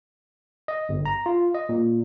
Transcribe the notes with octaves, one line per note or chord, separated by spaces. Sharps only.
D#5
G1
A#5
F4
D#5
A#2